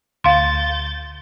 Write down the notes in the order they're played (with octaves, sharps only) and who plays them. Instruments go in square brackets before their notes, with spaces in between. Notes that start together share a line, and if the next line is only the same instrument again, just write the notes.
[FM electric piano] D2 [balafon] F5 C6 [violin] G6 A6